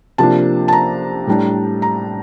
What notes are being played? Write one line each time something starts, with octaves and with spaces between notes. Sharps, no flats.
C3 F3 A#3 D4 A5
A5
A#5
A2 G3 D4
A#5